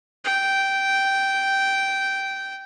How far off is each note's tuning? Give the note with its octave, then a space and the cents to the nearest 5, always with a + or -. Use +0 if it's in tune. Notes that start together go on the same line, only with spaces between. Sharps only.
G5 -10